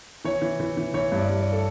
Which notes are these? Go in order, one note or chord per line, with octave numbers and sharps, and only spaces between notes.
E3 C#5
E3
E3
E3
E3 C#5
G2
D5
G2
D5
A4